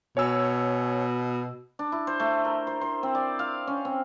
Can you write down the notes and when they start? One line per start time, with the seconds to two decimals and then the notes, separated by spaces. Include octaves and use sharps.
0.17 B2 C#5 G#5 E6
1.79 D4
1.92 E4
2.07 C5
2.20 A3
2.45 A#4
2.67 C5
2.81 C5
3.03 C4
3.15 D5
3.39 F5
3.67 C#4
3.85 C4